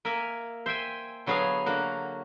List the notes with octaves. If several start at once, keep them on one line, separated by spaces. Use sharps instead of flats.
A#3 A#4 E5 G#5
C5 E5 G5 G#5
D3 F#3 B3 G#4 C#5 F5
D3 A#3 F#4